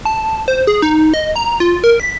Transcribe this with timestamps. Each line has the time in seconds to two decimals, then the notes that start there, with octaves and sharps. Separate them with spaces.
0.05 A5
0.48 C5
0.67 G#4
0.82 D#4
1.14 D#5
1.36 A#5
1.60 F4
1.84 A#4
2.00 B6